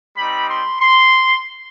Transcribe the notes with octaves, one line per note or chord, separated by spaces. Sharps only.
G3 C4 D#4 B5
C6
C6